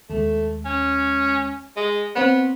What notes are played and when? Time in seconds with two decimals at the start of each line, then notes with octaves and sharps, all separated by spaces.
0.10 D#2 G#3 A3
0.65 C#4
1.77 G#3 D#5
2.15 B3 C4 C5 C#5